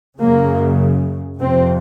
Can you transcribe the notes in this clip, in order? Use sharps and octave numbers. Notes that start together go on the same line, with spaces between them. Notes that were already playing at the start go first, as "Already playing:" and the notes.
F#2 C#3 A#3
F2 C3 C4